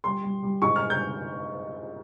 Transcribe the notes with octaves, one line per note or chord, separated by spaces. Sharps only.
G3 C6
G3
G3
G#2 C#6
F6
G6